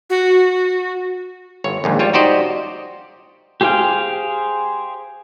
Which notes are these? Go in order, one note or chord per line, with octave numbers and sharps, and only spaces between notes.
F#4
G1 C#5
A#1 D#2 G#2
G3 F4 C#5
D#4 F#4 G4 C5 D5 D#5
G4 G#4 C5 F5 G5